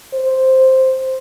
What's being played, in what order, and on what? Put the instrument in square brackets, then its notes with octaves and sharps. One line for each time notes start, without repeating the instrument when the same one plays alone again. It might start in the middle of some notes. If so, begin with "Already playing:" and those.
[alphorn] C5